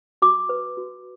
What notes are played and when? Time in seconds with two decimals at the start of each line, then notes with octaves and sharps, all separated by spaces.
0.22 F#4 D6
0.49 B4
0.77 F#4